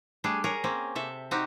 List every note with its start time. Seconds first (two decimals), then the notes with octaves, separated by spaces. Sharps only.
0.24 G3 A3 D4 G#4
0.44 G#4 A#4 C#5 A#5
0.64 A#3 C4 C#4
0.95 C3 A4 E5
1.31 C4 D#4 F#4 G4